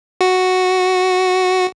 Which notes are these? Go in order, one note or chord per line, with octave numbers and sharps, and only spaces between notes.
F#4